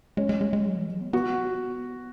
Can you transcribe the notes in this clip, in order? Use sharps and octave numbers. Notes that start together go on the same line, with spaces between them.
G#3 C#4
G#3
G#3
G#3
F#3
E3
F#3
B3
B3 F#4